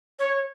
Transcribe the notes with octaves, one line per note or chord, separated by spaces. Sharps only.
C#5